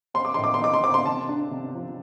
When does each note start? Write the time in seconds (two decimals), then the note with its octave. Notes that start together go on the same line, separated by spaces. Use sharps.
0.14 C4 C6
0.25 D6
0.34 A2 C6
0.44 D6
0.54 C6
0.60 D#4 D6
0.74 C6
0.83 C4 D6
0.94 C6
1.06 C3 A5
1.29 D4
1.51 C3
1.75 F3